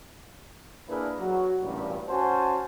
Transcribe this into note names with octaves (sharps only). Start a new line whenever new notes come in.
A#3 D4 E4 G#4 A#4 B4
F#3 F#4
A1 G2 A#2
C#4 F#4 C5 G#5 A5